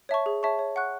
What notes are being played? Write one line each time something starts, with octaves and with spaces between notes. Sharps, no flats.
C#5 E5 A5 C#6
G#4
C#5 E5 A5 C#6
C#5
F#5 C#6 F#6